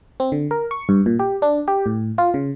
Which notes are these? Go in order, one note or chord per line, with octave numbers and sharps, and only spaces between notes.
C4
D3
A#4
C#6
G2
A#2
G4
D4
G4
A2
F4
C#3